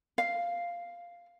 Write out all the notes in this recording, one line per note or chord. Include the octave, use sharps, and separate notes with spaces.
F5